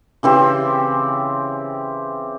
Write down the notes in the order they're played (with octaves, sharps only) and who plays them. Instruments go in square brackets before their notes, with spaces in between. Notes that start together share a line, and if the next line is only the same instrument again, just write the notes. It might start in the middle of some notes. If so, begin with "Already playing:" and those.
[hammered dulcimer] C#3 E3 C4 G4